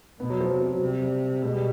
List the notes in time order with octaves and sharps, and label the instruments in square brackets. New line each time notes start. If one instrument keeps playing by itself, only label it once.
[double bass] B2 [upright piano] B3
[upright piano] F#3
F3
[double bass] C3 [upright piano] F#3
[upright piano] F3
F#3
[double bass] C3 [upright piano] G3
[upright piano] G3
[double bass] B2 [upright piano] G#3
[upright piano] G3